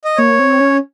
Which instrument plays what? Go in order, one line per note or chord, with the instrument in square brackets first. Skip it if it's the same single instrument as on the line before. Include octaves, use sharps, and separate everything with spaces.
[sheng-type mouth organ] D#5
[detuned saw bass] A#3 [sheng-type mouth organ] C#5
[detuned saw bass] C4
C#4